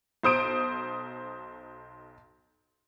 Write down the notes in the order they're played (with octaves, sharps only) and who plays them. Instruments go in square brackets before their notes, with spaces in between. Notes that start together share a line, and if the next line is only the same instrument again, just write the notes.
[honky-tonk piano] B1 C5 D#6 D7